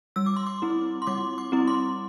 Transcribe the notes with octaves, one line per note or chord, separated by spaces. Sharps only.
G3 E6
D6
C6
D6
C4 E4
C6
G3 D6
D6
C4 E4
C6